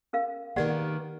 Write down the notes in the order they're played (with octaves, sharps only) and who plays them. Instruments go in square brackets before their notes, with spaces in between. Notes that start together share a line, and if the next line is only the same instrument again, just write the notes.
[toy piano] C#4 A#4 F5
[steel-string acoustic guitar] D#3 A#3 B3 [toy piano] G4 D5 F#5